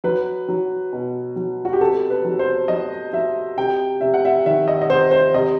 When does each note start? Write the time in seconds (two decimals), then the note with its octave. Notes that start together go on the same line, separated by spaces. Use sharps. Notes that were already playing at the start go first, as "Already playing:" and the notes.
0.04 F#3 B4
0.48 F#3
0.93 B2
1.36 F#3
1.65 F#4
1.73 G4
1.80 C3 A4
2.10 B4
2.25 F#3
2.39 C5
2.68 F#3 D#5
3.13 F#3 E5
3.57 C3 G5
4.01 C3 E5
4.14 F#5
4.25 E5
4.45 D#3 E5
4.68 D#5
4.82 D#5
4.89 C3 C5
5.11 C5
5.34 C3 D#5